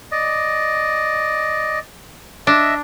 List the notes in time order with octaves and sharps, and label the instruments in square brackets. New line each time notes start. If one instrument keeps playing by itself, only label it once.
[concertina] D5 D#5
[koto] D4 [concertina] D#5 E5